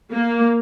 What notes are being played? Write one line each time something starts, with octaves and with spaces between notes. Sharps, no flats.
A#3